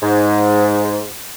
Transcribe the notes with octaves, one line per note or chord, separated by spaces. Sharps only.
G#2